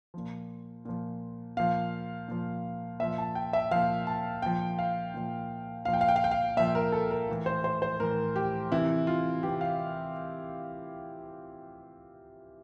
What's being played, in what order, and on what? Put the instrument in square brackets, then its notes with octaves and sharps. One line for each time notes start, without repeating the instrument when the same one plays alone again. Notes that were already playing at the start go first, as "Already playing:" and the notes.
[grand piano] A#2 F3
A#2 F3
A#2 F3 F5
A#2 F3
A#2 F3 E5
A5
G5
E5
A#2 F3 F5
A5
A#2 F3 G5
F5
A#2 F3
A#2 F3 F5
G5
F5
G5
F5
G5
F5
A#2 F3 E5
A#4
A4
A#4
A2 E3
C5
C5
C5
A2 E3 A#4
G4
C3 E3 E4
F4
C3 E3 G4
F5